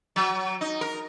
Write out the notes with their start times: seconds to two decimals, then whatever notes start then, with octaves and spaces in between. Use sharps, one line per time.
0.16 F#3
0.61 D#4
0.81 A#4